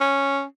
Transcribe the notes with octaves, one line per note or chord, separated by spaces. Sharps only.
C#4